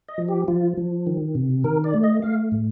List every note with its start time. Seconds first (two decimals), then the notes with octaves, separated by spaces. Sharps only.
0.09 D#5
0.18 F3
0.28 G4
0.48 F3 F4
0.77 F3
1.07 D#3
1.35 C3
1.64 D#3 A#4
1.84 D5
1.94 A3
2.03 D#5
2.22 A3 F5
2.52 A2